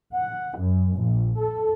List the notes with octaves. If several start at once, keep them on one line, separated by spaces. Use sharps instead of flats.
F#5
F#2
A#1
A4